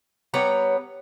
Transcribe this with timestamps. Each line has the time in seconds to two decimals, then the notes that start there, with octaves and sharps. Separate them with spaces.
0.34 G3 B3 C#5 A#5